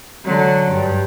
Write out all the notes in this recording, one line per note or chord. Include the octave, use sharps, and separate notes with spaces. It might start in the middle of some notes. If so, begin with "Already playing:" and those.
D3 F#3
G2